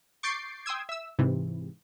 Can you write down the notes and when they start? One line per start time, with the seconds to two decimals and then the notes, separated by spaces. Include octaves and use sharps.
0.23 C#6 D6 G6 A6 C7 D7
0.66 G5 C6 D#6 E6 G#6
0.89 E5 E6
1.19 G#2 C3 E3